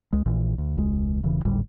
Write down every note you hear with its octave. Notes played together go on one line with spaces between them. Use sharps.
C#2 G#3
A#1 A#2 E3
D2
E1 C#2 G#3
E1 C#3 E3
G#1 D2 A2 G3